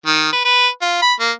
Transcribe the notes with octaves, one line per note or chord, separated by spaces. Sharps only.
D#3
B4
B4
F4
B5
A#3